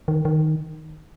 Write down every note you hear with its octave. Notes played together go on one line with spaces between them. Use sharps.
D#3
D#3